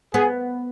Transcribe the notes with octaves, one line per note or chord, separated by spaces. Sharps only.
B3 G#4